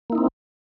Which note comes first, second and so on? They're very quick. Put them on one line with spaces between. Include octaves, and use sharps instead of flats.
A#3 E4 D#4 C4